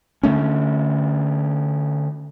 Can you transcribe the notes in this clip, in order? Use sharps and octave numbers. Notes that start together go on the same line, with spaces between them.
D3 F#3 A3 C#4